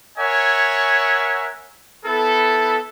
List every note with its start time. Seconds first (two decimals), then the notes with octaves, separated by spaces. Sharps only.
0.17 A#4 C#5 E5 F#5 G#5
2.04 B3 E4 A4